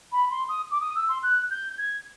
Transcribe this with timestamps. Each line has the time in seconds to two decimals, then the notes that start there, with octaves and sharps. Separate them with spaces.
0.12 B5
0.30 C6
0.49 D#6
0.71 D6
0.80 D#6
0.95 E6
1.08 C6
1.23 F#6
1.50 G6
1.78 G#6